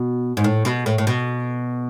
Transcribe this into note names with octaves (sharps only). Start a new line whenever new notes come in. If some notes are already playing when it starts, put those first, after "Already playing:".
Already playing: B2
G#2
A2
B2
A2
A2
B2